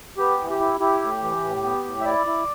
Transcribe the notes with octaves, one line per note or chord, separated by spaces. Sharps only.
B3 G4
E3
G4
E4
E4 G4
A2
E3
A2
B3
A2
E5
E4 D5
E4